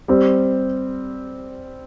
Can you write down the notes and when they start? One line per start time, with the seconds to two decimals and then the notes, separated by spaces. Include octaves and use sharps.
0.08 G3 C4